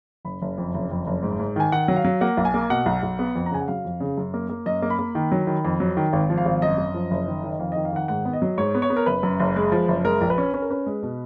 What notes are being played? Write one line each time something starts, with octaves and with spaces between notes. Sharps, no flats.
F#1 B5
F#1
F2
F#1
F2
F#1
G#2
G#2
D#3 G#5
D#3 F#5
F#3
F5
F#3
A#3 F#5
B1
G#5
A#3
B2 F#5
B1
B1
B3
F2
A#5
C#3 G#5
F#5
F#3 F5
F2
C#3
F#2
A#3
A#3
F#2 D#5
A#3
B5
A#3
D#3
F#3
D#3
F2
F#3
D#3
G#1
F3
F5
G#1
F#2 D#5
F#2
F3
F#1
D#3
D#3
D#5
F2 F5
D#3 D#5
F5
D#3 F#5
G#2 F#5
B3
D#5
F#3
G#2 C#5
B3
C#5
B3
A#4
F#1 B4
F#2
F#1
G#3
F3
F#1
G#3 A#4
A#1
B4
C#4
C#4 B4
A#4
C#4 B4
G#3
B2